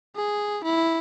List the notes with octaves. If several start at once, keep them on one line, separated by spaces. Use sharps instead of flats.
G#4
E4